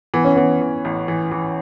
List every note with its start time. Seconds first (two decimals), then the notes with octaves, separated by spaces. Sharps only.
0.14 E3 B3
0.25 C#4
0.36 E3 B3
0.61 E3
0.85 A1
1.08 E3
1.31 E3